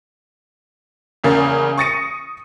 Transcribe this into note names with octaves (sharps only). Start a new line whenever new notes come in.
E2 C#3 A#3 A6
C#6 D#6 A6 A#6 C#7 D#7